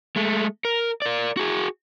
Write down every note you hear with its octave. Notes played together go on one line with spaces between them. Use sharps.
G#3 A3
A#4
A#4 D5
F#4 G#4